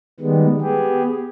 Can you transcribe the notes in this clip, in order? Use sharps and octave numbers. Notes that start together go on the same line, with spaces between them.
D#3 G3 G#3 B3
B3 G4 G#4